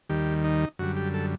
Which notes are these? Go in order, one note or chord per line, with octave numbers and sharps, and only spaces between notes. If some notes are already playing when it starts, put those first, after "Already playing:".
D#2 D#3 G3 G4
D#4
F#2 D3 G3 F#4
G4
A4